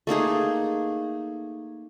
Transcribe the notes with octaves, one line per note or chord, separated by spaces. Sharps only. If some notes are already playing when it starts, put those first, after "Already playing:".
A3 A#3 D#4 G#4